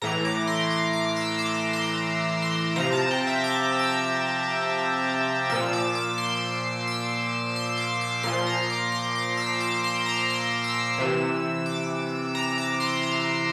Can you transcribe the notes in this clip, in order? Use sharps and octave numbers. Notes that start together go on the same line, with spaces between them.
A2 E3 A#5
D6
C6
D6
D6
E6
D6
C6
C6
C3 F3 A#5
A5
G5
E5
D6
E6
A#2 F3 E6
D6
D6
C6
E6
C6
D6
D6
A#2 F3 C6
A#5
D6
C6
D6
E6
D6
C6
A#5
C6
E6
C3 E3
D6
A#5
D6
C6
A#5